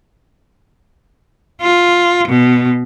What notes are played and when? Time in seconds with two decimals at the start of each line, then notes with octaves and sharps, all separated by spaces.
1.61 F4
2.28 B2